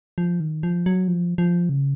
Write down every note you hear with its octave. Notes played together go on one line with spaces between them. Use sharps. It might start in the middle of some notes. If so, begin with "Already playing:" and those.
F3
D#3
F3
F#3
F3
F3
C#3